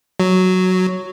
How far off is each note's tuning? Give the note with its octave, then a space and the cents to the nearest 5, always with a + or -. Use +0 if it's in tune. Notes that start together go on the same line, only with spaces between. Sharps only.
F#3 +0